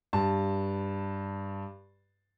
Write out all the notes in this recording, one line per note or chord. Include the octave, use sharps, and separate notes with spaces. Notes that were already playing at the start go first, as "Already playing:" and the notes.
G2 A5